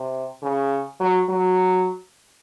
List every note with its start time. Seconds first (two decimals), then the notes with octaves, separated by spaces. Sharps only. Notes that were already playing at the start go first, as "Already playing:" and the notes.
Already playing: C3
0.43 C#3
1.00 F#3
1.29 F#3